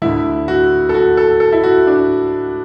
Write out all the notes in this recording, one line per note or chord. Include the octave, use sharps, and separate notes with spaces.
D2 D3 E4
F#4
A4
F#4
A4
A4
E4
F#4
D4